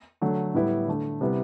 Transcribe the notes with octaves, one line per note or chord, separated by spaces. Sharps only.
D3 F#3 A3
A2 G3 B3 E4
D3 A3 D4
C3 G3 B3 E4